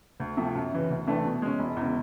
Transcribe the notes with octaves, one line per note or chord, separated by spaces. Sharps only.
D2
C3 F3 A3
F#2
C#3 E3
D2
C3 E3 A3 D4
B2
G#3 C#4
E1
E2 C#3